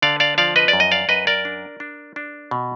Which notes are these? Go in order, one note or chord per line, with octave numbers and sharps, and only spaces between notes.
D3 D5 F5
D5 F5
F3 D5 F5
B4 D#5
D5
F#2
D#5
D5 F5
F#2 B4 D#5
A#4 D5
D4
D4
D4
B2